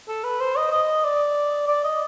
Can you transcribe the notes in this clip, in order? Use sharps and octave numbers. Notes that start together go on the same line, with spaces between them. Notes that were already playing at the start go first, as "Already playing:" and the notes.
A4
B4
C5
D#5
D#5
D5
D5
D#5